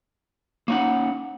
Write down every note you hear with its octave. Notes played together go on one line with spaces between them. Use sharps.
A#3 C#4 D#4 F#5